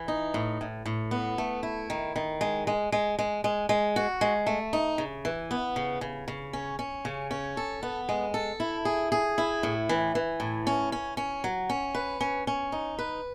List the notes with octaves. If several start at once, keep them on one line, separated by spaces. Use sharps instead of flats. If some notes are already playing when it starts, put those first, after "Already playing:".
Already playing: E3
D#4
A2
A2
A2
B3
A3
E4
D#3
D#3
G#3
G#3
G#3
G#3
G#3
G#3
F#4
G#3
A3
D#4
C#3
E3
B3
C#3
C#3
C#3
C#4
C#4
C#3
C#4
A4
B3
G#3
A4
E4
G#4
G#4
E4
A2
E3
E3
A2
C#4
C#4
C#4
F#3
C#4
B4
C#4
C#4
D#4
B4